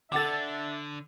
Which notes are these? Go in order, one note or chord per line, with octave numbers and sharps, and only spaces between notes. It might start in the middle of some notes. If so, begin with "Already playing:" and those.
D3 D4 A4 E5 F#5 D6 E6 A6